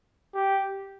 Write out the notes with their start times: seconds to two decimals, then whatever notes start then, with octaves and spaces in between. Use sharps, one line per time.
0.34 G4